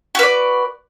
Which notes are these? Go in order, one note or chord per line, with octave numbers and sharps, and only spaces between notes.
F#4 B4 D5